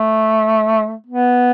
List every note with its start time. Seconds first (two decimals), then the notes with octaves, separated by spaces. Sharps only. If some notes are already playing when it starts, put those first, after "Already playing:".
Already playing: A3
1.07 B3